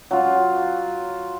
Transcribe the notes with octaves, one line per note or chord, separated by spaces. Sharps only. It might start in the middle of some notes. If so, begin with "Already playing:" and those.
F#3 F4